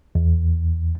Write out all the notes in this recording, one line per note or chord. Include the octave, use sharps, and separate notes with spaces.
E2